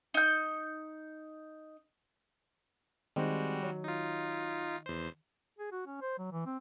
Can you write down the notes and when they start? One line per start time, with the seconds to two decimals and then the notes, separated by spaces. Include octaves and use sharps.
0.14 D#4 G6
3.16 D#3 G3 G#3 C4 F#4
3.62 F#3
3.84 D#4 F4
4.86 E2 C5
5.59 G#4
5.72 F#4
5.87 C#4
6.02 C5
6.18 F#3
6.32 E3
6.46 C4